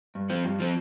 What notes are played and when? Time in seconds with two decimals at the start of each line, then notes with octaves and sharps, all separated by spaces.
0.15 G2
0.30 F3 C4
0.44 G2
0.60 F3 C4